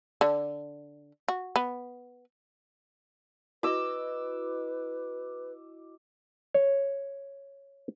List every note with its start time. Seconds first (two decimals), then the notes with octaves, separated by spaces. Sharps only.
0.21 D3
1.28 F#4
1.56 B3
3.63 E4 F#4 B4 D#5 D6 E6
6.54 C#5